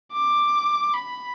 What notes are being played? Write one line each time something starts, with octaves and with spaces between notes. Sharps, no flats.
D6
B5